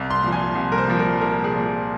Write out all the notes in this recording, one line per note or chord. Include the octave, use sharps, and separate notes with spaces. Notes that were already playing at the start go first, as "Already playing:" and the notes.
Already playing: C2
C6
A#2 F3
G#5
C2
A#4
C5
A#2 F3
A#4
C2 A#4
G#4
A#2 F3